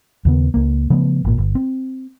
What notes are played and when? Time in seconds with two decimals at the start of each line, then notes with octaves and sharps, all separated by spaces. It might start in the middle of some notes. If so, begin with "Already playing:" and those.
0.25 D#2 C#3 B3
0.54 C#2 A#3
0.90 C#3 F3 A3 B3
1.25 G#1 A#2
1.38 G1
1.55 C4